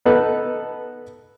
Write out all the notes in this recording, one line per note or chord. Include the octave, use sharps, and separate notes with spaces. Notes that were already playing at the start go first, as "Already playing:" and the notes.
B3 D#4 A4 B4